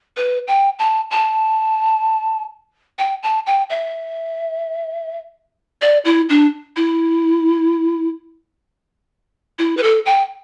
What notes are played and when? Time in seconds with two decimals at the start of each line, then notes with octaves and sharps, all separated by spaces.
0.17 B4
0.47 G5
0.79 A5
1.11 A5
2.99 G5
3.23 A5
3.46 G5
3.70 E5
5.82 D5
6.05 E4
6.29 D4
6.76 E4
9.59 E4
9.77 B4
9.83 A4
10.06 G5